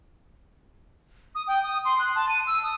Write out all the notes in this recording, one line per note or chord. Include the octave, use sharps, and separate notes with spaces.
D#6
G5
D#6
C6
F#6
A5
D#7
E6
D#6